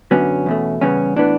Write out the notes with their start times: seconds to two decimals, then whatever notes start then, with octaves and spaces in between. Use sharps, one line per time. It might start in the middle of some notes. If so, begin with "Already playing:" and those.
0.11 F#2 D3 F#3 B3 C#4
0.46 E2 B2 A3
0.81 E2 C#3 G3 B3 C#4
1.16 A2 E3 B3 D4